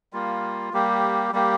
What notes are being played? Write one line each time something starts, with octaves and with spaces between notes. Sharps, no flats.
G3 A#3 F4
G3 A#3 G4
G3 A#3 G4